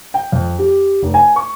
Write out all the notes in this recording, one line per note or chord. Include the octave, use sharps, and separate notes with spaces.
G5
F2
G4
F1
G#5
C#6